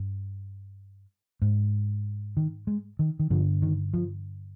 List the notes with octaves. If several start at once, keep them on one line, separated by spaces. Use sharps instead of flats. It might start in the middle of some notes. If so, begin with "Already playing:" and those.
Already playing: G2
G#2
D#3
G#3
D#3
D#3
G2 D3 F3
D#3
F3